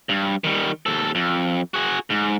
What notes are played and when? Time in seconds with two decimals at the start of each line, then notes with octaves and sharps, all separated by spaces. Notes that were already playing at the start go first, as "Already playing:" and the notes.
0.09 G2
0.44 D#3 G3
0.86 D#2 A4
1.15 F2
1.74 F#4 G#4
2.10 G#2